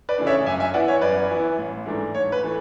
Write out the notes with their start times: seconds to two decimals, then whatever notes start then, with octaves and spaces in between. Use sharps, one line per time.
0.09 B4 D5
0.18 C#3 E3 A3 D4
0.27 C#5 E5
0.46 F#2 E5 G#5
0.60 E5 G#5
0.74 E3 B3 E4 D5 F#5
0.88 C#5
1.01 F#2 B4 D5
1.30 E3 B3 E4
1.58 A1
1.86 G#2 E3 A3 D4
2.14 A1 C#5
2.32 B4
2.44 E3 A3